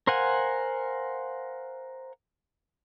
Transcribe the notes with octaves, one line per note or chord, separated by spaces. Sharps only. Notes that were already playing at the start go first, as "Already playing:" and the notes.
A#4 C5 F5 F#5 G#5